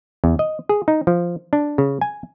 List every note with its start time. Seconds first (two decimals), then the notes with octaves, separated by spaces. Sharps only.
0.24 E2
0.39 D#5
0.69 G#4
0.88 D#4
1.07 F3
1.53 D4
1.78 C#3
2.01 G#5